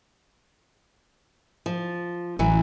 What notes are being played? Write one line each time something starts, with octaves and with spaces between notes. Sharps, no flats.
F3
A1 E3 F#3